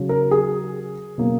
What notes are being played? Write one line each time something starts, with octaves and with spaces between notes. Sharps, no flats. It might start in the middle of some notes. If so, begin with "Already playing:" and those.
Already playing: C#3 F#3 C#4
A#4
G#4
B2 F#3 A#3 C#4